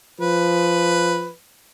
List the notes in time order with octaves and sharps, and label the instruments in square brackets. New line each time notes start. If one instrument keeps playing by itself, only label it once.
[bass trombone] F3 [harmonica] B4